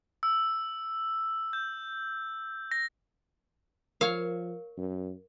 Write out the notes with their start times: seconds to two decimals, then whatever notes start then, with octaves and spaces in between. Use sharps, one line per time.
0.23 E6
1.53 G6
2.71 A#6
4.01 F3 A#4 C#5 F5
4.77 F#2